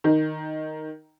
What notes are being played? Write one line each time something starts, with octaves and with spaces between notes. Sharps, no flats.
D#3